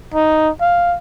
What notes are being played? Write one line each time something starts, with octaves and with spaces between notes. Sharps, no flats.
D#4
F5